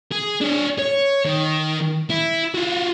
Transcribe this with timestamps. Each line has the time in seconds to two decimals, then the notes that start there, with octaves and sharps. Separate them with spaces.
0.12 G#4
0.41 D4 C#5
0.79 C#5
1.26 D#3
2.10 E4
2.55 F4 F#4